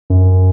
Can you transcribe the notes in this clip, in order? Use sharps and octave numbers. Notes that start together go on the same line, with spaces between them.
F#2